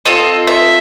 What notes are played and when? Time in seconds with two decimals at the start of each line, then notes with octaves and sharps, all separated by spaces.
0.05 C4 F4 A4 D#5
0.47 E5